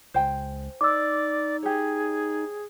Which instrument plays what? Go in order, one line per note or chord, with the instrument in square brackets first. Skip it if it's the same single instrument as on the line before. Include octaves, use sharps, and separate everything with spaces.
[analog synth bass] C#2 [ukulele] C5 G5 G#5
[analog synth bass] D#4 [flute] D5 [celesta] D6 E6
[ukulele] G4 C#5 [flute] G#4